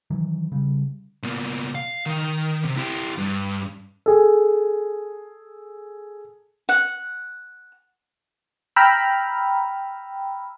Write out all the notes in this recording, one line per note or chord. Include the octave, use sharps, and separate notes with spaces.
D#3 E3 F#3
C#3 G3
B2 A#3
F5
D#3
C3
E4 G4
G2
G#4 A4
F#5
G5 A#5 B5 E6 F6